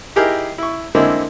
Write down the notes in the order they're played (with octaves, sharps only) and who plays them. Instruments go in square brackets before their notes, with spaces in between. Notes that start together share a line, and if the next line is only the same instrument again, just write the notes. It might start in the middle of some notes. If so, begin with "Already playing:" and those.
[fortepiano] D#4 E4 G4 G#4 A#4
E4 C#6
D3 G#3 A#3 C4 E4